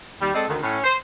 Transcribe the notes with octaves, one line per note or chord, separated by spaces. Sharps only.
D#2 G3
G#3 C4 A4 D5 D#5
D2 D#3
A2 C#4
C5